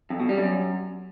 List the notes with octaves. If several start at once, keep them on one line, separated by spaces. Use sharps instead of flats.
F2
B2
G3
F#2